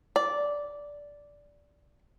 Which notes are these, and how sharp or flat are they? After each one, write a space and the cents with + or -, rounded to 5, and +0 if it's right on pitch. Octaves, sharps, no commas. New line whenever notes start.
D5 -10